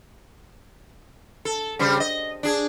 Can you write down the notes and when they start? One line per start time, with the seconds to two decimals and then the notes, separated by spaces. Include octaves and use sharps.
1.45 A4
1.79 C#3 G3 C5
2.00 D#5
2.43 D4 G#4